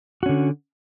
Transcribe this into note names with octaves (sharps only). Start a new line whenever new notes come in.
D3 C#4 F#4